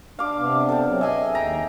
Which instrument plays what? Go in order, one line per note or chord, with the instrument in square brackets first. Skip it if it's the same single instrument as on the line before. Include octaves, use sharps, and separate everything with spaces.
[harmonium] D4 [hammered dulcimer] F5 D6
[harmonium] C3 B3 D4
[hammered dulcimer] A4 G5
[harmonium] F#3 C4
[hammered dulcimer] G#4 E5 [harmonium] D#5 G#5
[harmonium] D#2 G5 [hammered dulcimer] A#5